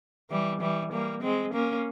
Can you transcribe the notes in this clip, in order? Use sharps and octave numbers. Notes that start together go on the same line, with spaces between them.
E3 G3
E3 G3
G3 A#3
G#3 C4
A#3 C#4